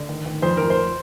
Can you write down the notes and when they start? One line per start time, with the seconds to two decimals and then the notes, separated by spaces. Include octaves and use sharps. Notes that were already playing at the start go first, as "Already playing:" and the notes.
Already playing: D3
0.09 D#3
0.26 D#3
0.42 F2 C5
0.57 F2 A#4
0.70 C5